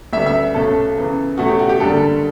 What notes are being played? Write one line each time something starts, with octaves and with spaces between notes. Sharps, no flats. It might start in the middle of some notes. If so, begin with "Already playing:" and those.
D2 C#3 G3 B3 E5
E5
B1 B2 A3 C#4 A4
E2 C#3 E3
E2 B2 A3 C#4 F#4
G4
F#4
G4
F#1 E2 D3 G3 A4